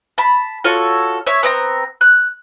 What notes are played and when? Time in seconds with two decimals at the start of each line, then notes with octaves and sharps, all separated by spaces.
0.18 A5 B5
0.64 F4 F#4 A4 C#5
1.27 C#5 E5
1.43 B3 C4 A#5
2.01 F#6